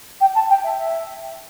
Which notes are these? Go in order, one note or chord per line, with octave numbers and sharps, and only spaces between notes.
G5
A5
G5
E5
E5